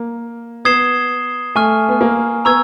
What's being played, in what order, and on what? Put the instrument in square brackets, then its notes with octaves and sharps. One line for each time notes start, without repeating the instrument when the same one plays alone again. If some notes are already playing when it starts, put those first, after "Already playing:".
Already playing: [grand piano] A#3
[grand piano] B3 [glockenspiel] D#6 G#6 C7 E7 G7
[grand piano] A3 [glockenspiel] G#5 C#6 F6
[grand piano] B3
A#3
[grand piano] B3 [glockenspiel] A#5 C#6 E6 G#6